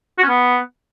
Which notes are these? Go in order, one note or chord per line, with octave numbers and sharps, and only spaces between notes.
F#4
C#4
B3